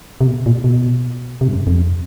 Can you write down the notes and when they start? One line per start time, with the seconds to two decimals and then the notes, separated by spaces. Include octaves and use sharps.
0.21 C3
0.26 B2
0.46 A#2
0.64 B2
1.41 C3
1.48 G2
1.53 F#2
1.67 F2